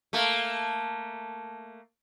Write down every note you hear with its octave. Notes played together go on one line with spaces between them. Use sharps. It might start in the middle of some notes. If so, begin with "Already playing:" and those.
A3 A#3